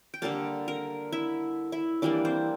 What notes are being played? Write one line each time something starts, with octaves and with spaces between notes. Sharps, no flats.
G5
D3 G3 A#3 A4 A5
A#4 A#5
E4 E5
E4 E5
E3 G3 A#3 D4 D5
C4 C5